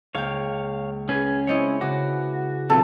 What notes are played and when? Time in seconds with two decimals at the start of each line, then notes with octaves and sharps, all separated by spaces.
0.15 C#2 A#3 C#5 F5 G5
1.09 C#4 G#4 B4
1.47 G#3 C4 E4 C#5 D#5
1.81 C#3 F#4 B4 D6
2.70 D#1 B1 B3 C4 F4 A4